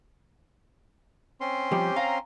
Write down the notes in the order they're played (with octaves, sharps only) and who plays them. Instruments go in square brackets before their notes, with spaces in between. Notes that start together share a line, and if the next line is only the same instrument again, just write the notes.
[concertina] C4 C#4 C6
[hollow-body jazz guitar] B2 F3 G3 [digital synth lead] G4
[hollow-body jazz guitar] F5 [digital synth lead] A#5